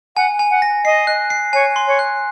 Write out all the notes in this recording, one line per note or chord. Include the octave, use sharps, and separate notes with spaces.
F#5 G#5
G#5
F#5
A#6
D#5 C7
F#6
C7
C#5 G#5
C6
C#5
F#6